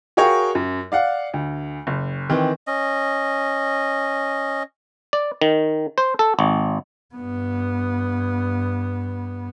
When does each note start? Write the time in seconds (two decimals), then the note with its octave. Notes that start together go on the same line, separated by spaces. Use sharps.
0.17 F#4 G#4 A#4 C#5 F5 G5
0.55 F#2
0.92 D5 F5 F#5
1.34 D2
1.87 F#1
2.30 D#3 E3 C4
2.67 C#4 D#5
5.13 D5
5.41 D#3
5.98 C5
6.19 A4
6.39 G#1
7.15 G2 B3